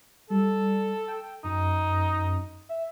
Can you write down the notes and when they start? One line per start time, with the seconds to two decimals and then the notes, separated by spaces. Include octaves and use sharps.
0.30 G3 A4
1.08 G5
1.44 F#2 D#4
2.69 E5